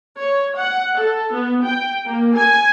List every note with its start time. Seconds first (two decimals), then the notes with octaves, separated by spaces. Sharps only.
0.19 C#5
0.59 F#5
0.99 A4
1.33 B3
1.66 G5
2.07 A#3
2.38 G#5